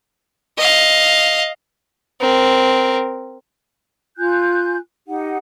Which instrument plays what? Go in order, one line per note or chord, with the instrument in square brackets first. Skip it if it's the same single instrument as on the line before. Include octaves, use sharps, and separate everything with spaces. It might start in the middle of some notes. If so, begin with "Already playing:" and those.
[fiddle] D#5 F5
C4 A#4
[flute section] F4 G#5 F#6 G6
D#4 G4 F#5